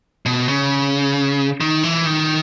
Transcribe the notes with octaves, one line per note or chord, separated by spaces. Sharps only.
B2
C#3
D#3
E3
D#3